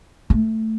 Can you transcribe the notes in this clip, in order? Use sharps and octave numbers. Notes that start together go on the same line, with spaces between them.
A3